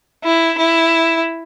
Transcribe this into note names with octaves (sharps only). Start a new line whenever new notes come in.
E4
E4